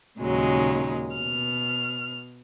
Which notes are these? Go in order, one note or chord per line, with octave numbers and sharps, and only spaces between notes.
D#2 A#2 C#3 F#3 G#3 D#4
B2 F6